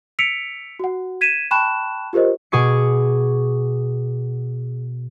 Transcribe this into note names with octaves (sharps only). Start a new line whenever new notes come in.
E6 B6 C#7 D7 F7
F#4 F#5
G#6 B6 D#7 E7
G5 A5 B5 C#6 F#6 E7
F4 G4 A#4 C5 D#5
B2 G#4 C#6 D6 C#7